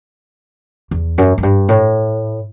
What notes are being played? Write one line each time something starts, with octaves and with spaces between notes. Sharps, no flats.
E2
F#2
F#2
G2
A2